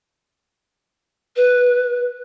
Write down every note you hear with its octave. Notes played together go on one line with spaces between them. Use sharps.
B4